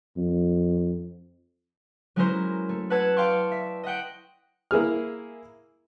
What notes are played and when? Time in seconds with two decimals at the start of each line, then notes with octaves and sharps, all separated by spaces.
0.17 F2
2.16 F#3 G#3 C#4 E4 A#4 C5
2.69 A3
2.90 B4 C#5 F#5 A5 E6 G#6
3.17 D5 F5 G5 C6 C#6
3.51 E5
3.83 D#5 E5 F#5 G5
4.71 A#3 E4 G#4 F6